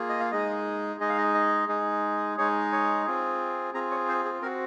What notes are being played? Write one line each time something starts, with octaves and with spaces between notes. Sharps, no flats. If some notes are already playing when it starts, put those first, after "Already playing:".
Already playing: A#3 F4 G#4
D#5
F5
G#3 D#4 G#4 D#5
G#3 D#4 G#4 D#5
F5
D#5
D#5
G#3 D#4 G#4
G#3 D#4 G#4 C#5
C#5
C4 F4 G#4
C4 F4 G#4 A#5
C#5
C5
G#4
C4 F#4 A#4